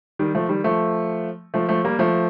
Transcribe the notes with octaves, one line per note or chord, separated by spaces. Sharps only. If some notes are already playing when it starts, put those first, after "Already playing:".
D#3 G3
F3 A3
D#3 G3
F3 A3
F3 A3
F3 A3
G3 A#3
F3 A3